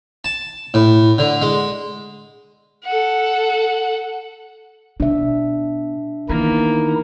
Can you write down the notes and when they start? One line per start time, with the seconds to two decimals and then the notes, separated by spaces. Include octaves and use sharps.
0.24 A5
0.74 A2
1.18 D3
1.42 G#3
2.84 A4 F#5
5.00 B2 D4 E5
6.29 D#3 E3 A#3 B3 D#4 E4